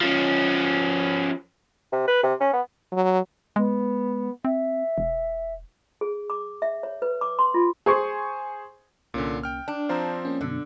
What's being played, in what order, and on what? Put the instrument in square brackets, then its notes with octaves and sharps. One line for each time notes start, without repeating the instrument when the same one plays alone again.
[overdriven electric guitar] F3 C#4
[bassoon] C3
B4
C3
C#4
B3
[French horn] F#3
[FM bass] G#3 [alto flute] B3
[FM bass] C4 [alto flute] E5
[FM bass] E1
[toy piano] G#4
D6
E5
C#5
B4
D6
C6
F4
[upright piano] G#4 C5 G#5 C6 C#6
[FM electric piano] C2 A#3 C#4 [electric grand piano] A#2 D3
[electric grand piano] G5 F6
[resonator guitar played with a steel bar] D4
[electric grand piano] F3 C4 C5 [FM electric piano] F5 A#5 E6
[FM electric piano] A#3 C#4
[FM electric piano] F#2 B2 [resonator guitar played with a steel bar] D3